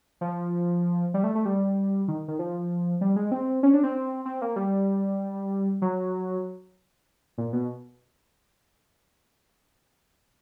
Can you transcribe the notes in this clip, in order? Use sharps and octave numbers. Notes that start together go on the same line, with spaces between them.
F3
G3
A3
A3
G3
D#3
D#3
F3
G3
G#3
C4
C#4
D4
C4
C4
A#3
G3
F#3
A#2
B2